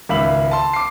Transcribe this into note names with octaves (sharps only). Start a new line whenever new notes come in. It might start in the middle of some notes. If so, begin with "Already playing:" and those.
G#1 C#2 E5 F5 B5 F#7
A5 C6
D6 C7